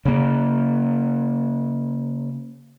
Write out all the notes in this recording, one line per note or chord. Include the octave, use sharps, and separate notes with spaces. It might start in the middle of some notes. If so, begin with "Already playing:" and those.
C#3 A#3